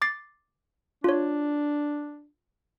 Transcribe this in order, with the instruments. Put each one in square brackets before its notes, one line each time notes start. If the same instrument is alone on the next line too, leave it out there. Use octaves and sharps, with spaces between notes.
[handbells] D6 A6 C7
[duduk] D4 [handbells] F4 C#5